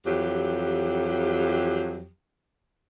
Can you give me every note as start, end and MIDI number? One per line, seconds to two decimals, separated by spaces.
0.07 2.08 41
0.07 2.08 52
0.07 2.08 54
0.07 2.08 67